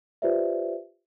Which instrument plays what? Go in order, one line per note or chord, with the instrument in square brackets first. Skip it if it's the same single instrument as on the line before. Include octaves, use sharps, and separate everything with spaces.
[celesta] F4 G4 B4 C5 D5 E5